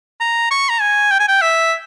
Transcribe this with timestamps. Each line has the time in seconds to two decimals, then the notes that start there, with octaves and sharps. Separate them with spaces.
0.21 A#5
0.51 C#6
0.70 A#5
0.81 G#5
1.11 G5
1.20 G#5
1.28 G5
1.42 E5